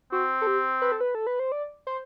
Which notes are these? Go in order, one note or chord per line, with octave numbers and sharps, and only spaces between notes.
C4 F#4
A4
G4
B4
A4
B4
A4
B4
C5
D5
C5